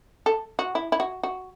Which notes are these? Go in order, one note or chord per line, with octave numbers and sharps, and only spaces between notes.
A4
F#4
E4
E4
F#4
F#4